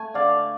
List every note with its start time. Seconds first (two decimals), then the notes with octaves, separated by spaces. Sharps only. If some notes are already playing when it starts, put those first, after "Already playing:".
Already playing: A3 G#5
0.14 D3 D5 F5